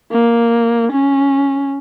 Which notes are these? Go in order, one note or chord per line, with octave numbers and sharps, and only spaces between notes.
A#3
C#4